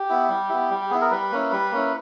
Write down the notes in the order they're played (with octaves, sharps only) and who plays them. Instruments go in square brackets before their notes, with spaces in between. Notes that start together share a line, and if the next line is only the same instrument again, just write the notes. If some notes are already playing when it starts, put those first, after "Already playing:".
Already playing: [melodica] G4
B3 E4
G3
B3 E4
G3
G4
B3 E4 G#4
A#4
G3 B4
A#3 C#4 E4
G3
A#3 C#4 E4